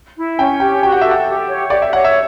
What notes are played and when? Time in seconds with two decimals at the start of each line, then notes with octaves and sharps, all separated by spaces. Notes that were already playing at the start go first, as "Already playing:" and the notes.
0.17 E4
0.38 C#4 G5
0.60 G4 G5
0.82 F#4 G5
0.92 F#5
1.01 A4 E5
1.11 F#5
1.27 G4
1.49 C#5
1.70 G4 D5
1.82 E5
1.93 C#5 F#5
2.04 E5